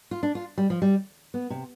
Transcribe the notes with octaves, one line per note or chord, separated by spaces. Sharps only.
F4
D4
F4
G3
F3
G3
B3
C3